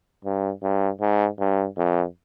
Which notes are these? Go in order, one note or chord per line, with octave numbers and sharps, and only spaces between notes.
G2
G2
G#2
G2
F2